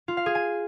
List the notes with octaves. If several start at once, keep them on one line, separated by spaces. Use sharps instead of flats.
F4
F5
G#4
G#5